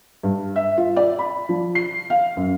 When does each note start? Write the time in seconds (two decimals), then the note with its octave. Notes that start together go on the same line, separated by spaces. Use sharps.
0.23 G2
0.56 E5
0.78 F4
0.96 D5
1.19 B5
1.49 F3
1.75 C7
2.10 F5
2.37 F#2